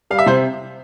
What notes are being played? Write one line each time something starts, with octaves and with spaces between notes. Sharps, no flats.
G3 F5
E5
C3 C5